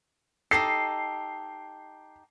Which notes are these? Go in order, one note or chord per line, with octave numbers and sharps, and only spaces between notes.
D#4 G4 A4 C7